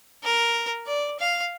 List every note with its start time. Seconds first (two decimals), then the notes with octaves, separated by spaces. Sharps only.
0.24 A#4
0.87 D5
1.19 F5